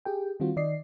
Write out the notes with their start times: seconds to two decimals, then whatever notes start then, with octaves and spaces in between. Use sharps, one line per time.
0.05 G4 G#4 G5
0.40 D#3 G3 C4 F4 F#4
0.56 D#3 D5 D#5 C7